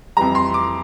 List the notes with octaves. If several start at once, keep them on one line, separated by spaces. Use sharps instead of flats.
F2 E3 G3 A#5
C6
D6